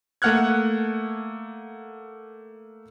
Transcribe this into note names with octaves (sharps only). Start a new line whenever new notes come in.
A3 A#3 F#5 F6 F#6 G#6